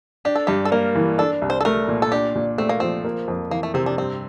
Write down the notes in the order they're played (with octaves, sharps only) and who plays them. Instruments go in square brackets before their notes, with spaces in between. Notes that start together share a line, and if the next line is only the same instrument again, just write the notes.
[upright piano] D4 [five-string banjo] G4
[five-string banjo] A4
[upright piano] G2 [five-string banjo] G4
[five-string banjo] A4
[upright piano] A#3 [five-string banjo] A#4
[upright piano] E3
[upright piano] D4 [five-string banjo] A4
[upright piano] C2
[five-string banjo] C5
A4
[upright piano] A3 [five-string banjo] A#4
[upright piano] A#2
[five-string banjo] A4
[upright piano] D4 [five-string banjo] G4
[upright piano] A#2
[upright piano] A3 [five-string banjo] C4
[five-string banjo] A#3
[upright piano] F3 [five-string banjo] C4
[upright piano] A#3
F2
[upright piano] E3 [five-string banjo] A#3
[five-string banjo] A3
[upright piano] C3 [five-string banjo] C4
[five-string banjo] D4
[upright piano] G2 [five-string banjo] C4